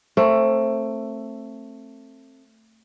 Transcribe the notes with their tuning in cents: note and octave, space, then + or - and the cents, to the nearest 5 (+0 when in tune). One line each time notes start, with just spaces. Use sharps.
A3 +15 C4 +25 A#4 +0